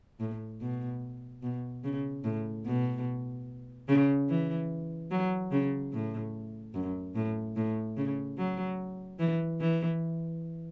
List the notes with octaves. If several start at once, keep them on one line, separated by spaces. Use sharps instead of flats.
A2
B2
B2
C#3
A2
B2
C#3
E3
F#3
C#3
A2
F#2
A2
A2
C#3
F#3
E3
E3